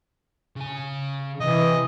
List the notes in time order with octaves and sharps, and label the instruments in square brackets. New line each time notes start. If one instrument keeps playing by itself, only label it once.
[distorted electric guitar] C#3 G#5
[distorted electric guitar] C3 [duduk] E3 [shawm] D#5